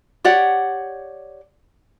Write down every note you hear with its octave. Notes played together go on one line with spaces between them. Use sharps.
G4 C#5 D5 F#5